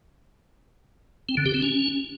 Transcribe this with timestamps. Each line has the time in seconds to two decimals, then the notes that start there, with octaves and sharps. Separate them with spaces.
1.29 C4
1.37 D3
1.46 G4
1.54 C4
1.62 C#4